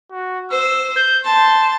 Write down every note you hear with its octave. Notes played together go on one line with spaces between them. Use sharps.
F#4
C5 E6
G6
A5 C6